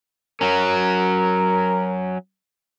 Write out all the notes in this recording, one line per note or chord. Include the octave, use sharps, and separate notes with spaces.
F#3 C#4 A#4